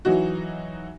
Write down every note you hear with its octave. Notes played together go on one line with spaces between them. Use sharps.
E3 F#3 D#4 F#4